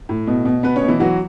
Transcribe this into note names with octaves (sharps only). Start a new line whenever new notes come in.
A2
B2
B2
B2 B3 B4
C#4 C#5
B2
E3 E4
E3 F#3 F#4